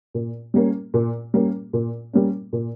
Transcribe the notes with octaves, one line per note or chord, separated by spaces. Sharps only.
A#2
G3 A#3 C#4
A#2
G3 A#3 C#4
A#2
G3 A#3 C#4
A#2